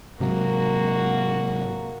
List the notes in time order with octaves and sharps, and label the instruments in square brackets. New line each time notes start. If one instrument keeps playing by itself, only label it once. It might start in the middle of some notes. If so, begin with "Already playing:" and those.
[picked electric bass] G#2 C3 F#3 [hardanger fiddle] A#3 F#4